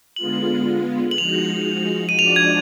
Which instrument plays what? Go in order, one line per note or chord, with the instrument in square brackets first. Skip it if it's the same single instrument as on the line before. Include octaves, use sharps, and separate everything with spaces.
[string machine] D3 G#3 B3 F4 [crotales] F#7
[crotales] F#7
[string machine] F3 G#3 D#4 F#4 [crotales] F7
[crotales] D#7
[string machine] F3 G#3 D4 F#4 D5 [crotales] F7
[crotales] G#6